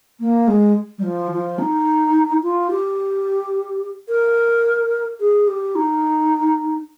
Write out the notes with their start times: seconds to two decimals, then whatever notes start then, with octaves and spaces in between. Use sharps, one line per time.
0.20 A#3
0.47 G#3
0.98 G3
1.02 F3
1.31 F3
1.58 D#4
2.42 F4
2.70 G4
4.08 A#4
5.20 G#4
5.47 G4
5.75 D#4